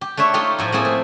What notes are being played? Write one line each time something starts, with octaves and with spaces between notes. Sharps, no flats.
G4
A3 D4 C#5 E5
A3 D#4 F4 G4 A4
A2 F3 E4
F3 A#3 C4 E4 G#4 A4
A3